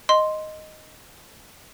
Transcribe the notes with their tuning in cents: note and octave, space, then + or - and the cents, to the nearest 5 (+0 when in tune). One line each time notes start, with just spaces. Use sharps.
D#5 +0 C6 +0